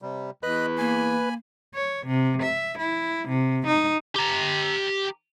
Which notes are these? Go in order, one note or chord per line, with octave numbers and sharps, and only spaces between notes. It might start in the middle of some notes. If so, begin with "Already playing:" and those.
C3 G3
E2 B4 D#5 B5 F#6
A#3 G#5 B5
C#5
C3
E5
E4
C3
D#4
G4 A#5